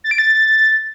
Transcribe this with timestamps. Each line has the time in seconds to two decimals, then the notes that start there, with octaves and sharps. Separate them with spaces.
0.04 A6
0.11 D7
0.18 A6